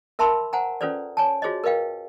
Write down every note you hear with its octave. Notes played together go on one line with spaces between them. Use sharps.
A#4 E5 A5 B5 C6 E6
C5 F#5 G#5 A#5
C#4 F4 A4 B4 C5 D5
C#5 G#5 A5
F4 F#4 G#4 C5 C#5 D#5
A#4 B4 D#5 F5 G5